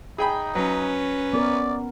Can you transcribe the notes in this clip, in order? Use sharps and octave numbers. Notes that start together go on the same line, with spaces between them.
D#4 G#4 G5 B5
F#3 C#4 B4
B3 A#4 D5